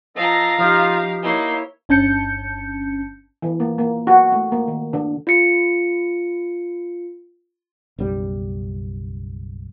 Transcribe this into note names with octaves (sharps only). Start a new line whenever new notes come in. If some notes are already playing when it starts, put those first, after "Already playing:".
F3 A4 D#5 F5 A#5
F3 D#4 F4 G4
A#3 D#4 E4 C#5 C6
G1 C#4 A5 G6 C#7
E3
A#3
A#3
F#4
A3
A#3
D#3
D3
F4 C#7
F#1 B1 G3